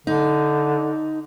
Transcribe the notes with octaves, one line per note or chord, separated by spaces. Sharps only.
D3 D#4